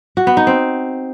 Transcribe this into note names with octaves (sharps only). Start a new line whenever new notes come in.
F#4
B3
D#4
C4